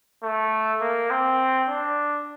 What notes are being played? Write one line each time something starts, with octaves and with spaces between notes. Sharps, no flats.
A3
A#3
C4
D4